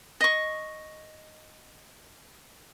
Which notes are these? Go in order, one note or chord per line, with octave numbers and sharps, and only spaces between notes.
D#5 C#6